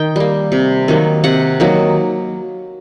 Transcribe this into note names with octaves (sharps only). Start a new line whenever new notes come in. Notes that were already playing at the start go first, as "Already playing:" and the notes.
Already playing: D#3 G5
G3 A#3
C3
D#3 F#3 A#3
C3 F#5
D#3 F#3 A#3